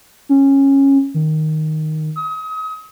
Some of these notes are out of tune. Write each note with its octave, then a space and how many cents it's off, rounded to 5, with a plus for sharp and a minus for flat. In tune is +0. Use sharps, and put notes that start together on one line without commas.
C#4 -15
D#3 +0
D#6 +35